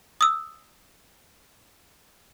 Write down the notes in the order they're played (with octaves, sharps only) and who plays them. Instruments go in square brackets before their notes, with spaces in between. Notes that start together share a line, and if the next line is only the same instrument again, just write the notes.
[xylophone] D#6 E6